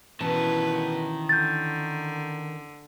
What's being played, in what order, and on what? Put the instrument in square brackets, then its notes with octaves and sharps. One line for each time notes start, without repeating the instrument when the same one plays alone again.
[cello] B2 B4 [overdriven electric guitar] D#3 A5 [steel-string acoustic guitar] E3 C#4
[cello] D3 [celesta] G6 A6